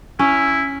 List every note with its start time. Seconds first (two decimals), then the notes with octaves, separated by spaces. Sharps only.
0.19 C#4 E4